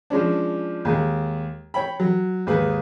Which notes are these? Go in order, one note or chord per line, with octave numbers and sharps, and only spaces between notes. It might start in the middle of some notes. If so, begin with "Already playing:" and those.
F3 G#3 C#4 D4
D#2 G#3
C#5 G5 B5
F#3
D#2 G#2 G#4 B4